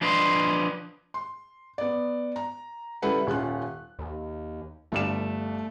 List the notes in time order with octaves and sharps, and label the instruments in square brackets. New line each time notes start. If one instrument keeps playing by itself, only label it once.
[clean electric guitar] F3 D4 B4 D#5 G#5 C6
[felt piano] C6
B3 D5
A#5
C#3 G3 E4 A4 B4 F#5
D#1 C#4 F4 F#6
[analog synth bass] D#2
[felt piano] G1 G3 E7 [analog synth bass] A3